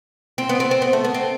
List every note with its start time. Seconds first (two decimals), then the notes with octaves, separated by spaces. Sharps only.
0.38 C4
0.49 B3
0.60 C4
0.71 C4
0.82 B3
0.93 A3
1.04 B3
1.14 C4